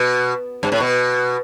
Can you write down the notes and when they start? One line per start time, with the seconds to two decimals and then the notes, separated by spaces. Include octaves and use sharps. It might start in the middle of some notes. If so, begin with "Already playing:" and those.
Already playing: B2
0.63 G2
0.72 A2
0.80 B2